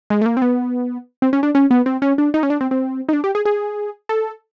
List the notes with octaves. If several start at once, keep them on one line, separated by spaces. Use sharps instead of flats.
G#3
A3
A#3
C4
B3
C4
C#4
D4
C#4
B3
C4
C#4
D4
D#4
C#4
D4
C4
C4
D#4
D4
G4
G#4
G#4
A4